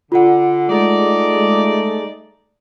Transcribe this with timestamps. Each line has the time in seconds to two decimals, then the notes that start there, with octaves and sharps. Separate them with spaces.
0.12 D3 F4 F#5
0.70 G#3 A3 D#4 D5